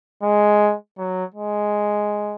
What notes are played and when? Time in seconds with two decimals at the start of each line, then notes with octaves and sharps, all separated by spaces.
0.22 G#3
0.98 F#3
1.34 G#3